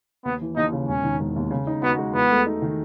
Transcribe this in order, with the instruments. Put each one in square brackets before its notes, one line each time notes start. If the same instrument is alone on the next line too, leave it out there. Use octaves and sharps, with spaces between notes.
[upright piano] D#2 [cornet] B3
[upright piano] E3
[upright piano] D#2 [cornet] D#4
[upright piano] C#3
[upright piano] E1 [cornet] C#4
[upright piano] D#3
E1
D#2
C#3
D#4
[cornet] B3 [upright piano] F#4
[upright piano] G#3
[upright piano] E2 [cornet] B3
[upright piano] A3
D#4
D#3